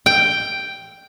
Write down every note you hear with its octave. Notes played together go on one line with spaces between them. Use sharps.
G5